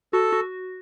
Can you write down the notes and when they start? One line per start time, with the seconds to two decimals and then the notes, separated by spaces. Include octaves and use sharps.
0.13 F#4 A4
0.32 F#4